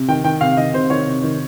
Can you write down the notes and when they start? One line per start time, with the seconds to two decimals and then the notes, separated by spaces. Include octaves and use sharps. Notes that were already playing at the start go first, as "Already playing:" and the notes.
Already playing: C3
0.08 D#3 G5
0.24 D#3 G5
0.41 C3 F5
0.57 D#3 D#5
0.74 C3 C5
0.90 D#3 C#5
1.06 C3
1.23 D#3